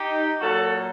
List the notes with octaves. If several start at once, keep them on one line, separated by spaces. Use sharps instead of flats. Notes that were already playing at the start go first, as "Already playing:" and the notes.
Already playing: D#4 G4
A#2 F#3 F#4 A4